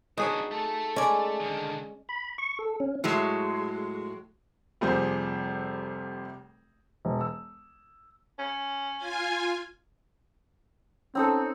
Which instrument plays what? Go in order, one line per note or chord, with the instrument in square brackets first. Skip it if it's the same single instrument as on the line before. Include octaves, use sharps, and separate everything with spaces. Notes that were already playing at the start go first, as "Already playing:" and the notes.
[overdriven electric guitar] B3 D4 [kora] D#4 G#4 C#5 [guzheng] F#4
[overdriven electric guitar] A3 A4
[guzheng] G#3 D5 [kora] C#4
[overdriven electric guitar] D3 D#3
[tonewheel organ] B5
C#6
A4
C#4
[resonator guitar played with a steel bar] A2 F#3 G#3
[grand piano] F1 C3 F3 G3 G#4 C5
[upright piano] E1
E6
[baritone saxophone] C#4
[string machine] F4 G#5
[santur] C4 D#4 A4 [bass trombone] C#4